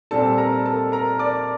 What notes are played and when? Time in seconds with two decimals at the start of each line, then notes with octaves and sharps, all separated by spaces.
0.11 A#2 G3 C4 A4 A5
0.38 A#4 A#5
0.66 A4 A5
0.92 A#4 A#5
1.19 D5 D6